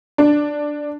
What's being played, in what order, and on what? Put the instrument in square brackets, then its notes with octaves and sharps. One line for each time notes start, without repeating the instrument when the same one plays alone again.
[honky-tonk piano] D4